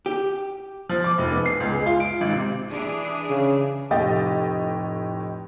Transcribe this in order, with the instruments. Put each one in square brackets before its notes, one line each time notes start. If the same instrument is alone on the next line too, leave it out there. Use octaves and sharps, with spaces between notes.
[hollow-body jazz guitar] G4
[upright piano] F3
D6
F1
B3
C7
C#2
G#3
F4
D7
G#1
C3
[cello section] E3 D4 G#4
[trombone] C#3
[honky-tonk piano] F1 A2 G4 D#5 A6